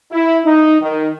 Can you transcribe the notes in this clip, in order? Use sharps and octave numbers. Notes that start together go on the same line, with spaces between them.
E4
D#4
D#3